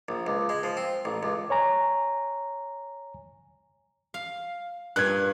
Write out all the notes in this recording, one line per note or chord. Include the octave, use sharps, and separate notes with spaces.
A#1
C#2
G#3
F3
C4
A1
C#2
C#5 G#5 A#5
F5
G2 A#2 F#6 G#6